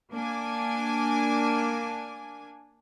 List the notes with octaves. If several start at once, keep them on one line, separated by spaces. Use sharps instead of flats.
A#3 D4 G#5